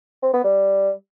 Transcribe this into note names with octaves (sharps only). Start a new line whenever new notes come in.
C4
B3
G3